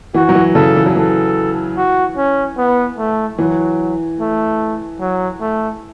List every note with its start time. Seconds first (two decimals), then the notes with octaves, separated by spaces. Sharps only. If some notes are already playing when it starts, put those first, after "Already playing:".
0.14 E3 F#4
0.29 F#3
0.35 E3
0.55 C#3 A4
0.76 E3
0.86 F#3
0.95 E3 A4
1.77 F#4
2.17 C#4
2.58 B3
2.98 A3
3.38 E3 F#3
4.20 A3
5.00 F#3
5.41 A3